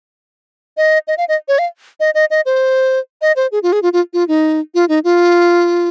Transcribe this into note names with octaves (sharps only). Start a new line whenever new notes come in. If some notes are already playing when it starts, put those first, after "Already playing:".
D#5
D#5
F5
D#5
C#5
F5
D#5
D#5
D#5
C5
D#5
C5
G#4
F4
G#4
F4
F4
F4
D#4
F4
D#4
F4